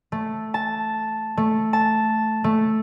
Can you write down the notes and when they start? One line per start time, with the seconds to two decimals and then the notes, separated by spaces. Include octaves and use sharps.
0.12 A3
0.54 A5
1.37 A3
1.73 A5
2.44 A3